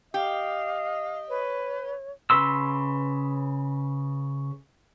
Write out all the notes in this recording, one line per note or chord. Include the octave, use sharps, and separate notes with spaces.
G4 D#5 F5
B4 C#5
C#3 B4 C6 E6